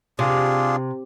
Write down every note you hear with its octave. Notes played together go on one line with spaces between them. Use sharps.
C3 D4 F4 G#4